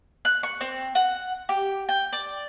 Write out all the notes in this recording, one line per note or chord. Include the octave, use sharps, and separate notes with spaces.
F#6
C#6
C4
F#5
G4
G5
D5